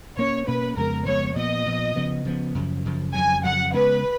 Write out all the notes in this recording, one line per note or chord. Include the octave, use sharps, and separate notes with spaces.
B2 A#3 C#4 C#5
B2 A#3 C#4 B4
F2 C#3 G#3 B3 A#4
F2 C#3 G#3 B3 C#5
A#2 F3 B3 D#5
A#2 F3 B3
C#3 F3 B3
C#3 F3 B3
F#2 C#3 F3
F#2 C#3 F3
F2 C#3 F#3 G#5
F2 C#3 F#3 F#5
C#3 G#3 B3 B4